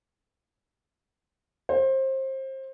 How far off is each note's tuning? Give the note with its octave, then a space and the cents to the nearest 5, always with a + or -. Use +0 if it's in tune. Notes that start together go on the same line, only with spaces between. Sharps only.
C5 +25